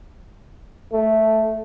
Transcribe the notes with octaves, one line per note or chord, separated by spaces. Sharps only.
A3